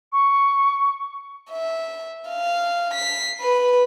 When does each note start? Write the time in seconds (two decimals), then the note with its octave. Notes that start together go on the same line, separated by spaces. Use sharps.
0.12 C#6
1.51 E5
2.29 F5
2.93 B6 C7
3.40 B4